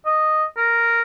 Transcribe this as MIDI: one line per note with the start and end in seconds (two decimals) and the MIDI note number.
0.06 0.44 75
0.57 1.02 70